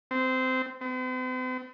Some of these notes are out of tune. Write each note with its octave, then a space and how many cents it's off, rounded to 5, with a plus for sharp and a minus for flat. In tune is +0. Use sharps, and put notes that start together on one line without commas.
C4 -20
C4 -45